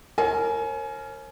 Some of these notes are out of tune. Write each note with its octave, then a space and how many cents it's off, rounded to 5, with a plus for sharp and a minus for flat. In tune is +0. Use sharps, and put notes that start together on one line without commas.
A#4 -15 C#5 -45 G#5 +30